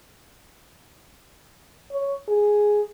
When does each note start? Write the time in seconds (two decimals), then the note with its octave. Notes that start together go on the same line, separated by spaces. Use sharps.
1.91 C#5
2.28 G#4